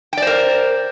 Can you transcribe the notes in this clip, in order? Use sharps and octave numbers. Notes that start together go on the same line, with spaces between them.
A#4 C5 D5 G5